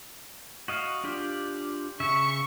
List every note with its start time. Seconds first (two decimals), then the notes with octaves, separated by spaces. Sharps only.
0.68 F#4 D#5 F5
1.04 D4 F4 G4
2.00 C#3 E5 C#6